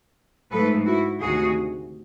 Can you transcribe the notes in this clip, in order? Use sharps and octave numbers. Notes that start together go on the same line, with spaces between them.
G#2 F3 A3 A4 B4
E4 F#4
D2 C3 D#3 F#4 G#4